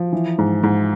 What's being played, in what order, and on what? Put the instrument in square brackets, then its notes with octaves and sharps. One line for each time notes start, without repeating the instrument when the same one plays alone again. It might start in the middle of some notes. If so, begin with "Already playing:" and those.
Already playing: [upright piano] F3
E3
G#2
G#2